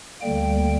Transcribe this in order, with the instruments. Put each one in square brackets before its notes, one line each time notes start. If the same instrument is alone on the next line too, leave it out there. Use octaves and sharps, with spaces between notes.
[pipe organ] D2 D3 G3 A#3 G5